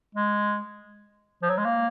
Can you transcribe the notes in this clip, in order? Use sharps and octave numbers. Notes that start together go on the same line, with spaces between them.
G#3
F3
F#3
G#3
A#3